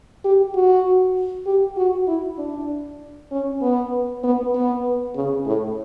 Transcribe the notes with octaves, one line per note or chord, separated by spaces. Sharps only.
G4
F#4
G4
F#4
E4
D4
C#4
B3
B3
B3
C#3
A2